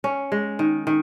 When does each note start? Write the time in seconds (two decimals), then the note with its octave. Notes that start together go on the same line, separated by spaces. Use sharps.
0.04 C#4
0.32 G#3
0.59 D#3
0.87 D#3